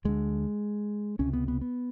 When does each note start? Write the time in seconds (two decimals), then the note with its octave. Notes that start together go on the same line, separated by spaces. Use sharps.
0.05 D2 D3 G#3
1.19 C#2 C3 C#4
1.33 B3
1.48 B3
1.61 B3